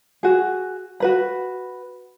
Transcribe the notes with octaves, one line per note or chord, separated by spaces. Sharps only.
F#4 G#4
F#4 B4 B5